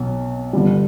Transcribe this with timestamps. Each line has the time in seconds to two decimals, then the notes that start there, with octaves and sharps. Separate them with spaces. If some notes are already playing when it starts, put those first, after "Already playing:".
Already playing: B1 B2 F#3
0.53 G1 G2 D3 G3